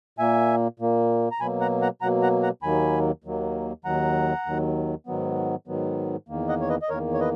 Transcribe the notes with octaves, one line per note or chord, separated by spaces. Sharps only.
A#2 A#3 E5 G#5
A#2 A#3
A#5
B2 F#3 A#3 G#5 B5
F#5 A#5
F#5 A#5
B2 F#3 A#3 F#5 A#5
F#5 A#5
F#5 A#5
D#2 D#3 F#3 A#3 G#5 B5
D#2 D#3 F#3 A#3
D#2 D#3 F#3 F#5 A#5
D#2 D#3 F#3
G#2 D#3 F#3 B3
G#2 D#3 F#3 B3
E2 D#3 A#3
D#5 F#5
C#5
B4 D#5
D#5
E2 D#3 A#3 A#4 C#5
C#5
B4 D#5